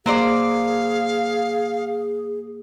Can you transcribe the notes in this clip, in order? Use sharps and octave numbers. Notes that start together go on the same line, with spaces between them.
F#3 A#3 G#4 C5 D5 F5